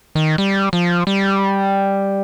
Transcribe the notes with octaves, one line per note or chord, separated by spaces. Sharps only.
D#3
G3
F3
G3